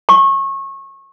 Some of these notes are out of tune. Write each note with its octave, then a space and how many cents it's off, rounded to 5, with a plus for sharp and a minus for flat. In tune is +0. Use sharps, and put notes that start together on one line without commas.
C#6 -25